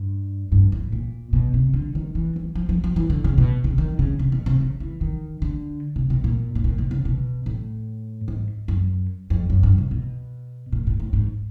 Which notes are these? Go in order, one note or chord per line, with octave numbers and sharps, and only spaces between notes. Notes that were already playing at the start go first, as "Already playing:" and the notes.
Already playing: G2
G2
A2
A#2
B2
C3
D3
D#3
E3
E3
F3
F3
F3
E3
D3
C#3
B2
C#3
D#3
C#3
C3
B2
C3
C#3
E3
D#3
D3
C3
B2
A#2
A2
A#2
B2
C#3
B2
A2
G#2
F#2
F2
F#2
G2
C3
B2
A#2
A2
A2
G#2